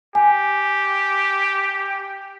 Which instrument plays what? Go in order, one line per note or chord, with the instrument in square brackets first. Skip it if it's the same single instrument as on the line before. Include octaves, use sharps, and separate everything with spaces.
[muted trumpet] G4 [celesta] G#5